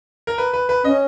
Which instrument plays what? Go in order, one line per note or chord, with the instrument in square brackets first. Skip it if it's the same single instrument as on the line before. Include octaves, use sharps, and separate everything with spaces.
[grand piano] A#4
B4
B4
B4
[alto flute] C#4 [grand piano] D#5